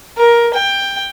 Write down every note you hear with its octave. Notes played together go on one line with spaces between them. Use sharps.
A#4
G5